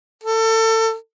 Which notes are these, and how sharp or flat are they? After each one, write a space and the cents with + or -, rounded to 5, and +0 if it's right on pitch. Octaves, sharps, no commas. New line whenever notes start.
A4 +30